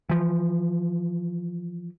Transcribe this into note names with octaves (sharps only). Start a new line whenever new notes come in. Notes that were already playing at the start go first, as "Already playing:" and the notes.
E3 F3